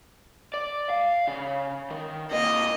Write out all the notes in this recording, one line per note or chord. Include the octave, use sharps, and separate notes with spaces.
D5
F5
C#3
D#3
C3 A#3 D#5